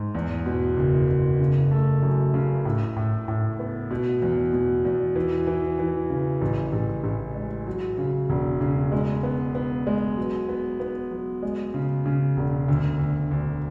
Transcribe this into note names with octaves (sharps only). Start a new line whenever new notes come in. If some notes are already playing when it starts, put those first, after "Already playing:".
Already playing: G#2
E2
B2
F#1
F#1
C#3
A3
F#2
C#3
A2
A2
A2
B3
B2
E2
B2
E2
E3
E3
E3
C#3
A1
A1
A1
G#3
F#3
C#3
E1
C#3
G#3
B3
B3
G#3
F#3
B3
B3
F#3
G#3
C#3
C#3
E1
D2
D2
D2